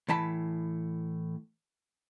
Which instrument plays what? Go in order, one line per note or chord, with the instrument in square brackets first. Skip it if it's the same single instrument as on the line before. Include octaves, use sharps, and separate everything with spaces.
[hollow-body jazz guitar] A2 E3 A5 B5